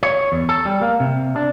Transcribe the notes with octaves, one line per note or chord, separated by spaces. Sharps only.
C#5
E2
A4
G3
A#3
C3
D4